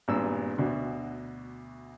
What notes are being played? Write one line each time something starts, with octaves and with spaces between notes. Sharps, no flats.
G#1 G2 A#2 B3 E6
D2 B2 D3